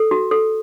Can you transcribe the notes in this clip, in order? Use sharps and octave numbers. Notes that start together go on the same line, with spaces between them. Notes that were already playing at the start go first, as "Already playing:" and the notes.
Already playing: A4
F#4
A4